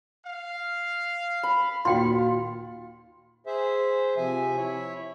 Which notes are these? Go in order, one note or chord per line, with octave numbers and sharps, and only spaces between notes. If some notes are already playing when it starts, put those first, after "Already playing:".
F5
B5
D#2 A#2 F4 F#4 G5 C6
G#4 C5 E5
C3 F3 E5 G#5
E4 C#5 E5